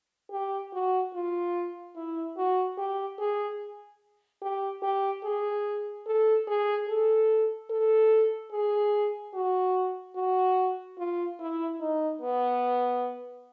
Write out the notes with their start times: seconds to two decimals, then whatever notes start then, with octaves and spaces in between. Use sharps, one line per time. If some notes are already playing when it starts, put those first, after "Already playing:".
0.32 G4
0.73 F#4
1.14 F4
1.96 E4
2.37 F#4
2.78 G4
3.19 G#4
4.42 G4
4.83 G4
5.24 G#4
6.07 A4
6.48 G#4
6.89 A4
7.70 A4
8.52 G#4
9.34 F#4
10.16 F#4
10.98 F4
11.40 E4
11.81 D#4
12.22 B3